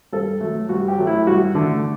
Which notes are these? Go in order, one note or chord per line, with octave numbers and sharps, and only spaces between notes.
G2 A4
F#3 A3
G2 F#4
G4
F#3 A3
E4
G2 F#4
D3 A3